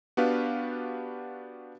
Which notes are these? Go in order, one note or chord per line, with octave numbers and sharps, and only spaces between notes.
B3 D4 F#4 G4 B4 F5